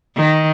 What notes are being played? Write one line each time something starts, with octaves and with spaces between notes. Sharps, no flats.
D#3